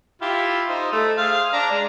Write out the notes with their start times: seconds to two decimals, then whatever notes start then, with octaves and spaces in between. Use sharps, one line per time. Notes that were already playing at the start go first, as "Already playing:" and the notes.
0.22 E4 F4 G4
0.69 D#4 C5
0.93 A3
1.18 G#4 C5 F5
1.53 D4 A#5
1.71 G#3